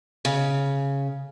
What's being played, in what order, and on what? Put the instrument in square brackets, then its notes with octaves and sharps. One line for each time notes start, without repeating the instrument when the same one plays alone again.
[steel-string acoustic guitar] C#3